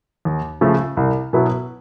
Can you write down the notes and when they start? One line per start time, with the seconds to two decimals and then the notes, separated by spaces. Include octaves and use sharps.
0.25 D#2
0.61 C#3 F3 A3
0.97 C2
1.33 B2 F#3 B3 E4